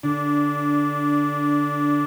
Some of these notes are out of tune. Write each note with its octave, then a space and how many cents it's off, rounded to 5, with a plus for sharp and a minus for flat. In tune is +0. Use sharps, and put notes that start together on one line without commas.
D3 +0 D4 -15